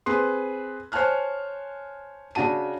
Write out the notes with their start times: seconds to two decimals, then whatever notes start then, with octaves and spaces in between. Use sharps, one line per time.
0.06 C4 G#4 B4 C6
0.92 C5 C#5 G#5 A5 F6 F#6
2.35 C#3 D4 F#4 A5 D#7